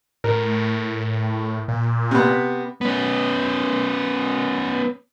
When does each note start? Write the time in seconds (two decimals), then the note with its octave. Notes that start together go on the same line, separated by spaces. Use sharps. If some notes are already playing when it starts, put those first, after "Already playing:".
0.24 A2 A#4
1.68 A#2
2.11 C3 B3
2.81 B3 C#4